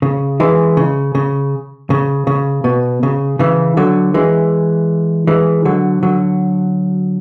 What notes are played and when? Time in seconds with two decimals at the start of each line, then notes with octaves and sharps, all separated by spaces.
0.02 C#3
0.40 E3 G#3
0.77 C#3
1.15 C#3
1.90 C#3
2.27 C#3
2.64 B2
3.03 C#3
3.39 C#3 E3
3.77 D3 F#3
4.14 E3 G#3
5.27 E3 G#3
5.65 D3 F#3
6.03 D3 F#3